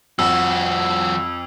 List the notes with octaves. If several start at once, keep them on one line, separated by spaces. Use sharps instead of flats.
F2 F3 F#4 E6